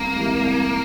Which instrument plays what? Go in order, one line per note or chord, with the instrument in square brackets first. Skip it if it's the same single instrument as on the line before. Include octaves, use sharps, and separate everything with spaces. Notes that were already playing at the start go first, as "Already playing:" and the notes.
Already playing: [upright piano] C2 [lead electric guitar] A#3
[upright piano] C3 E3 G#3
C2